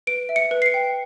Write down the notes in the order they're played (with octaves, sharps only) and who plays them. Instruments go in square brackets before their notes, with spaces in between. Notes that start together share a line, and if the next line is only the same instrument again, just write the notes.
[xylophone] B4 D7
E5
C#7
B4
C7
C#7
G5